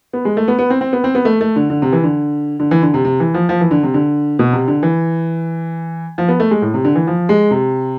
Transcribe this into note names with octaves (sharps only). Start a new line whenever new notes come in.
B3
G#3
A3
B3
B3
C4
C4
B3
C4
B3
A3
A3
D3
D3
C3
E3
D3
D3
E3
D3
C3
C3
E3
F3
F3
E3
D3
C3
D3
B2
C3
D3
E3
F3
B3
A3
G#3
A2
C3
D3
E3
F3
G#3
C3